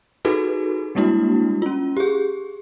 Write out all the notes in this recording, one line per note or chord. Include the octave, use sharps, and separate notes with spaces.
D#4 F4 F#4 G#4 A4 B4
G3 G#3 A#3 D4 E4 F#4
C#4 F4
G4 G#4